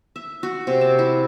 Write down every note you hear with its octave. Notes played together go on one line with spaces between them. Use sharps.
E5
F#4
C3
A5
E4